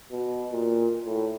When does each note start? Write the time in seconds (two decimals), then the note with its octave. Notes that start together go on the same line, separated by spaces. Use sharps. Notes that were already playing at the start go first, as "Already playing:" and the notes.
0.12 B2
0.52 A#2
1.06 A2